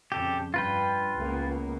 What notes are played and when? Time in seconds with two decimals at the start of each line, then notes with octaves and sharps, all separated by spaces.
0.12 F2 C#3 G4 A4
0.54 G2 F4 B4 G5
1.17 C#2 A#3 B3